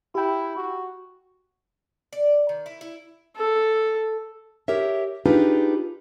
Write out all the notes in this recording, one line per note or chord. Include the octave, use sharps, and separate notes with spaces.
E4 G4 G5
F#4
D5
D#3
E4
E4
A4
G4 A#4 C#5 E5
D4 D#4 F4 G4 G#4 B4